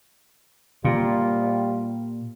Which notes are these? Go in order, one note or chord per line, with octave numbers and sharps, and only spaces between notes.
A#2 G3 F4